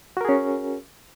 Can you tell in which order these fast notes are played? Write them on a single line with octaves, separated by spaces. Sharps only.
F#4 A#4 G#4 C#4